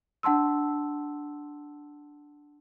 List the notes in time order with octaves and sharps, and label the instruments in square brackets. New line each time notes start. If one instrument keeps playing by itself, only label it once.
[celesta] D4 F#5 A5 C6 E6